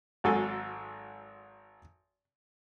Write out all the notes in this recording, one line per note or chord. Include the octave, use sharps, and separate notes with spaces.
G#1 G#2 F#3 A4 G#5